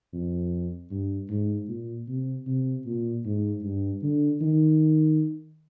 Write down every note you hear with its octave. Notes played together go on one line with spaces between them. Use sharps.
F2
G2
G#2
A#2
C3
C3
A#2
G#2
G2
D3
D#3